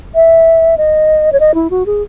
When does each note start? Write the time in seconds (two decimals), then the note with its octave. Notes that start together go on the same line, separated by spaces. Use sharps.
0.15 E5
0.77 D#5
1.32 C#5
1.40 D#5
1.54 E4
1.70 F#4
1.86 G#4